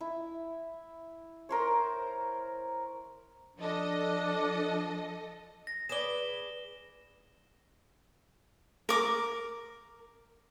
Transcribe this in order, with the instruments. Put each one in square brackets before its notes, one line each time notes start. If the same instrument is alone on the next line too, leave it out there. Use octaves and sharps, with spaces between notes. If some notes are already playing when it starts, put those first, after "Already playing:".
[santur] E4
A#4 C5 C#5
[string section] F3 A4 D#5 [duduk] D4
[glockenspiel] A#6
[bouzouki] G#4 B4 D5 [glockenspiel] E7 G7
[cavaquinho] A#4 D6